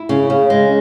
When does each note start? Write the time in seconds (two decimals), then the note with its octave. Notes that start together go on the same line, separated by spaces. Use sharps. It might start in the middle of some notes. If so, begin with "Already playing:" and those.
Already playing: E4
0.09 C#3
0.30 C#3
0.50 G#3